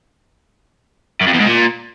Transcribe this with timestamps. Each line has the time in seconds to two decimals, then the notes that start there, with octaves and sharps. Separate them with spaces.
1.21 F#2
1.28 F2
1.34 E2
1.40 G#2
1.47 A#2